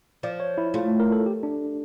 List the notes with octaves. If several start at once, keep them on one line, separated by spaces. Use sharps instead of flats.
F3 D5
C#5
E4
A3 F4
A#4
A4
G4
D4